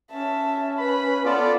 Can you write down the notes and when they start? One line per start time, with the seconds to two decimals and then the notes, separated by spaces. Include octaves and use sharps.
0.11 C#4 E5 A5
0.78 B4 B5
1.25 B3 F4 A4 D5